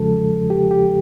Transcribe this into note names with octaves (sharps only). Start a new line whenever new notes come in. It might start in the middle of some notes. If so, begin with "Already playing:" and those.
Already playing: E2 C#3 F3 G#3 A4
G4
G4